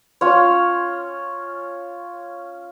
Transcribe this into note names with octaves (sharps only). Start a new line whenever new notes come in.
C#4 F4 C#5